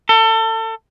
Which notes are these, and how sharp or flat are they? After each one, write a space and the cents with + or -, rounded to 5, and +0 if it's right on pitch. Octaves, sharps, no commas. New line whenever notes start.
A4 +30